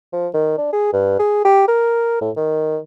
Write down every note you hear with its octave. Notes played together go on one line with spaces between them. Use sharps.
F3
D#3
D4
G#4
G2
G#4
G4
A#4
A2
D#3